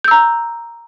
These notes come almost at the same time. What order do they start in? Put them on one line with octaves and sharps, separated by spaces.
G6 E6 A#5